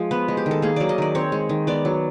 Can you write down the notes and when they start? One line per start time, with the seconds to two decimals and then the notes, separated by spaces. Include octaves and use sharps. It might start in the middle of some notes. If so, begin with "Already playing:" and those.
Already playing: F3 G#3
0.11 B3 B4
0.28 G#3
0.37 G4
0.46 D#3
0.51 A4
0.62 A#3 G#4
0.76 F#3 D5
0.89 D#5
0.98 D#3 D5
1.15 C4 C#5
1.32 G#3
1.49 D#3
1.67 B3 D5
1.85 F#3